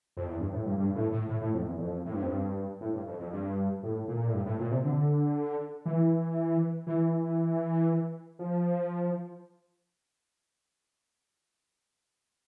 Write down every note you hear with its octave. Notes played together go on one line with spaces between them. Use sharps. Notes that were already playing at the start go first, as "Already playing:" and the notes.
F2
E2
G2
A2
G2
G2
A2
A2
A2
A2
F2
E2
F2
A2
G2
F2
G2
A2
G2
F2
F2
G2
A2
A#2
A2
G2
A2
A#2
C3
D3
E3
E3
F3